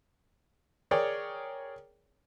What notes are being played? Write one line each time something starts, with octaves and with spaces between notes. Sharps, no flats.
G#4 A#4 C#5 D5 G5